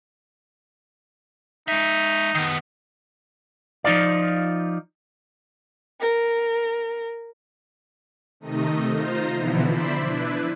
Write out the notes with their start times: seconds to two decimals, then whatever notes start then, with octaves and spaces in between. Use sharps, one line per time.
1.68 G#3 D#4 E5
2.35 D#3 B3
3.84 F3 D#4 F4 D5
6.00 A#4
8.40 C3 D#3 A3 D#4 D#5
8.92 D#4 F4 C5 A#5
9.35 B2 D3 E3 F3 B3 E4
9.66 C5 D5 E5 B5
10.00 D4 E4 B4